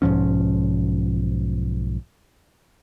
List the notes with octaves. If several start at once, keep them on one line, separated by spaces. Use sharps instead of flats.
B1 G#2 F3 C#4